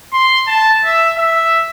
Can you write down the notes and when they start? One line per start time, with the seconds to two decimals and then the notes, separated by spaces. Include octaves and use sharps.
0.13 C6
0.47 A5
0.84 E5
1.17 E5